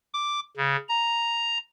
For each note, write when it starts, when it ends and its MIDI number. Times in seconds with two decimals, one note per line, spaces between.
0.14 0.40 86
0.57 0.76 49
0.89 1.58 82